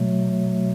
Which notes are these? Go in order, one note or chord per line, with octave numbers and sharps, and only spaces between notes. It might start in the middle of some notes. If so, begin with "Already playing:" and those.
Already playing: B2 F#3 A3